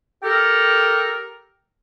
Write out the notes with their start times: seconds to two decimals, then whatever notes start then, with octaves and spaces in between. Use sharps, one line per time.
0.23 G4 A4 A#4